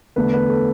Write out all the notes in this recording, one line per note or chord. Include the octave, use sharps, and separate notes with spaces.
E2 D3 A3 B4
B4
A4